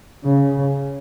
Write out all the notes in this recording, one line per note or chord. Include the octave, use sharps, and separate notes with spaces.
C#3